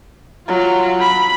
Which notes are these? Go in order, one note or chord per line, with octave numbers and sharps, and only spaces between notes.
F#3 F4
B5